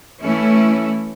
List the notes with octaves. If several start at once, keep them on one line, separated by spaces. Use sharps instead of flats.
E3 A3 C#4 E4